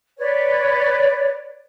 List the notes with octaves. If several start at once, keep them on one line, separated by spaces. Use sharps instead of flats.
B4 C#5 D5